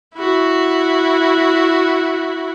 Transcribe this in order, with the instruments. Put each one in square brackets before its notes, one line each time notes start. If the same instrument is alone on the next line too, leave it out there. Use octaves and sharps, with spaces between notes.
[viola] E4 F#4